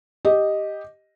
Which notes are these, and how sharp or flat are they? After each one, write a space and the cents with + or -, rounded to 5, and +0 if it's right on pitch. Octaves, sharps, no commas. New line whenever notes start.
G4 +0 D#5 +0